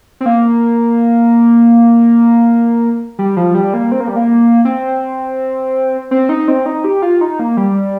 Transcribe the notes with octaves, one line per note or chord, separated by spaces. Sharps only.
C4
A#3
G3
F3
G3
A#3
C4
A#3
G3
A#3
C4
C4
D#4
C4
D#4
G4
F4
D#4
A#3
G3